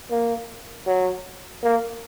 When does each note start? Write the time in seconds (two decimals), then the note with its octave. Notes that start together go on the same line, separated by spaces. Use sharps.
0.11 A#3
0.87 F#3
1.63 A#3